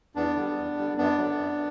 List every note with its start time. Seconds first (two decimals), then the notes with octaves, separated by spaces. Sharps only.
0.15 E2 B3 D4
0.36 D3 G3
0.57 E2
0.78 D3 G3
0.98 F#2 B3 D4
1.18 D3 F#3
1.38 F#2